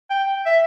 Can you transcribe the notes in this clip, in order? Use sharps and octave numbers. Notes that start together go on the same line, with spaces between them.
G5
E5